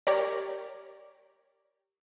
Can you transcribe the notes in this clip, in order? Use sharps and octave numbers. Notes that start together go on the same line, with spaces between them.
G4 A#4 C#5 D5